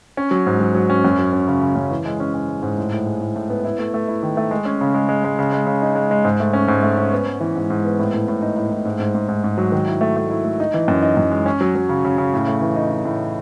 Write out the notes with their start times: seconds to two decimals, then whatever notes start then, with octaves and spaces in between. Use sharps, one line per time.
0.17 C#4
0.31 F#3
0.46 G#2
0.61 F#3
0.75 F#3
0.90 C#4
1.05 F#2
1.19 F#3
1.33 C#4
1.48 C#3
1.61 C#3
1.76 F#2
1.91 E3
2.06 G#3
2.20 C#4
2.34 C#4
2.48 G#3
2.63 G#2
2.78 A2
2.92 A2
3.06 G#3
3.21 A2
3.36 A2
3.50 B3
3.65 E4
3.79 A3
3.94 A3
4.08 E4
4.23 D#3
4.37 A3
4.51 G#3
4.65 C#4
4.81 C#3
4.94 G#3
5.09 G#3
5.24 G#3
5.39 C#3
5.52 G#3
5.67 C#3
5.82 D#4
5.96 G#3
6.11 G#3
6.25 G#2
6.40 A3
6.53 C#4
6.68 G#2
6.83 A3
6.98 C#4
7.13 B3
7.27 B3
7.41 E3
7.55 G#2
7.70 G#2
7.85 B3
7.99 A2
8.14 A2
8.28 A2
8.42 D#4
8.57 A2
8.72 A2
8.85 G#2
9.00 G#2
9.15 G#2
9.29 G#2
9.44 G#2
9.58 F#3
9.72 D#3
9.87 E4
10.01 A3
10.17 A3
10.30 E4
10.44 A3
10.60 D#4
10.74 E3
10.88 F#2
11.03 D#4
11.17 F#2
11.31 G#3
11.46 C#4
11.61 F#3
11.75 F#3
11.89 C#3
12.05 C#3
12.18 C#3
12.34 A2
12.48 A3
12.61 E3
12.76 D#4
12.90 D#4
13.05 A2